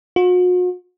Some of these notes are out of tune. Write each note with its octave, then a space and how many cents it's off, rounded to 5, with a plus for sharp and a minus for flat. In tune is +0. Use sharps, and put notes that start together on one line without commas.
F#4 -40